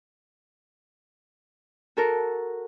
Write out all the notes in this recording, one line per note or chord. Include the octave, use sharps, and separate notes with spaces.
F#4 A4 A#4